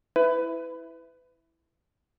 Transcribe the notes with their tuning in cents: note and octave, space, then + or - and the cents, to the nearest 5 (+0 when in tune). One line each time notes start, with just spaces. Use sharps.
E4 +0 B4 +25